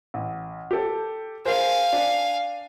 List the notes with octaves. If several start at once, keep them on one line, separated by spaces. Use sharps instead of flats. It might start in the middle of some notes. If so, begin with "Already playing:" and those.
A1
G4 A4
G#4 A#4 C5 F5 G#5
D4